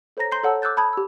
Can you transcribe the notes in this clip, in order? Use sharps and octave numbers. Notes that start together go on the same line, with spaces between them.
A4 C5 C#5 A#5 A#6
A#5 C6 G6 C7
A4 C#5 F#5 A5 E6
D6 E6 F#6 G6 A6
A5 B5 D#6 G#6
G4 E6